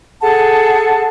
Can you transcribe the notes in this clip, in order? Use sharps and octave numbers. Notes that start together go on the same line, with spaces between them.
G#4 A4 F#5 A5